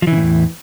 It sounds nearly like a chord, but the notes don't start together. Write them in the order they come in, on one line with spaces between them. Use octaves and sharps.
F3 E3 C#3 A2 E2